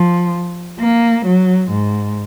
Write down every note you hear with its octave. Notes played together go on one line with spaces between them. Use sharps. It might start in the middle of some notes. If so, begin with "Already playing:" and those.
Already playing: F3
A#3
F#3
G#2